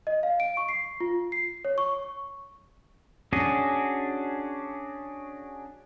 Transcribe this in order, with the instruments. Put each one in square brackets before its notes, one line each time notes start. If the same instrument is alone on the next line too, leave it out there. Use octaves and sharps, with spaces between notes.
[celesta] D#5
F5
D7
C#6
C7
F4
C7
C#5
C#6
[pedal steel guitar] C#4 D4 F#4 G#4